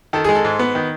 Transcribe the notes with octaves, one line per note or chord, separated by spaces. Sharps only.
D#3 A4
G#3 G#4
A4
G#2
B3
D#3